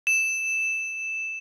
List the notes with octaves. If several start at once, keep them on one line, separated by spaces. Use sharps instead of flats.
E7